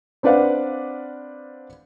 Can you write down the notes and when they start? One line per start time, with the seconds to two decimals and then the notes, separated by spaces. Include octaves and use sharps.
0.23 C4 D4 B4 D5 F5 F#5